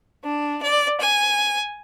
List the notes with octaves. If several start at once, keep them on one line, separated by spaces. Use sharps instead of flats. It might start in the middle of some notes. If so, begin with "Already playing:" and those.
D4
D5
G#5